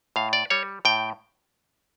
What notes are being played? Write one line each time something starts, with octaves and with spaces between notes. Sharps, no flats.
A2 F5
D5
G3 C#5
A2 G5